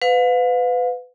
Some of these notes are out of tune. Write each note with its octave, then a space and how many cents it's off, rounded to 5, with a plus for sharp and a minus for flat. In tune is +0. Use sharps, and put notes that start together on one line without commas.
B4 +30 F5 +35